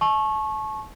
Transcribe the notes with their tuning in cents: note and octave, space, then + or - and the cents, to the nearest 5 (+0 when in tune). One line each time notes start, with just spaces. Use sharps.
A5 -35 C#6 -20